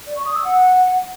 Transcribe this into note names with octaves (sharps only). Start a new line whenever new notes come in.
D5
C#6
D#6
E6
F#5